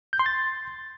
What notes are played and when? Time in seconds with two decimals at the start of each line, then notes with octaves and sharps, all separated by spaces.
0.13 G6
0.19 C6
0.26 A6